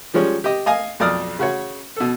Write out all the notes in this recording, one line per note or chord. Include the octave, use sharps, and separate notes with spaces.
F3 G3 G#3 C#4
G4 D#5
D#5 F5 G#5 D#6
B1 F2 D5 D#6 F6
C#3 F#4 C#5
B2 A4